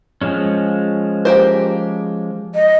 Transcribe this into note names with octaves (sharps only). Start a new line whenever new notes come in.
F3 G#3 C#4
A#3 G4 C5
D#5